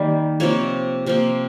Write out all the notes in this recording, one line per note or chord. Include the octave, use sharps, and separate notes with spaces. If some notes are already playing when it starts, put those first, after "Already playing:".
Already playing: D#3 G3 A#3
C3 F3 A#3 C#5
C3 F3 A#3